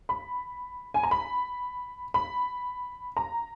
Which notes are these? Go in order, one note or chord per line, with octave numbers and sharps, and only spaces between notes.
B5
G#5
A#5
B5
B5
A#5